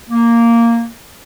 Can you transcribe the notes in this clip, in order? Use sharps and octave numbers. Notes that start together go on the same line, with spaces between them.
A#3